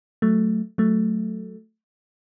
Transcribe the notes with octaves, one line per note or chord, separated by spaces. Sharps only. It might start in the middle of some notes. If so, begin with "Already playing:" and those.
F#3 A3
F#3 A3